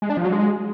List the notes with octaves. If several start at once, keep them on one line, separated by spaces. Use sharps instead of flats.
G#3
D4
F3
F#3
G#3